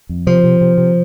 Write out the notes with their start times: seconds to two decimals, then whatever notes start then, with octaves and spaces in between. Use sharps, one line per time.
0.09 F2
0.27 C3 F3
0.44 C3
0.61 C3
0.77 C3